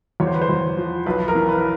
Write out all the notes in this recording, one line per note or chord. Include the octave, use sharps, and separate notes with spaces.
E2 C#5
C5
B4
C5
E2
F3
B1 B4
A#4
E3
B4